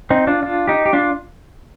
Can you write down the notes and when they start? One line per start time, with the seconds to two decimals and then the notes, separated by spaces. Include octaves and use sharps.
0.10 C4 D#4
0.27 D4 F4
0.43 D4 F4
0.68 D#4 G4
0.86 G4
0.93 D4 F4